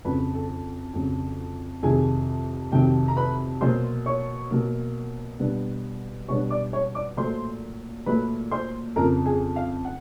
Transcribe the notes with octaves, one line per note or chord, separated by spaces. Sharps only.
F2 C#3 F#3 B4 B5
A4 A5
F2 C#3 F#3
F2 C3 D#3 F#3 G#4 G#5
F2 C3 D#3 F#3 G4 G5
A#5
B4 B5
B2 F#3 A#3 C5 C6
C#5 C#6
B2 F#3 A#3
B2 G3 B3 D4
B2 G3 B3 D4 C#5 C#6
D5 D6
C#5 C#6
D5 D6
A#2 F#3 A3 C5 C6
A#2 F#3 A3 B4 B5
C5 C6
F2 C#3 F3 A#4 A#5
G#4 G#5
F5
F#5